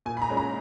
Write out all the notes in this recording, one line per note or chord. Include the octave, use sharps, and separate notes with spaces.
A#2 G#5
B5
A#5
G#3 C#4
A#5